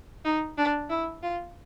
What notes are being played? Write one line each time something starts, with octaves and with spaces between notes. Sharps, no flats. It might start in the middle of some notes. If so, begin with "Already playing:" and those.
D#4
D4
E4
F4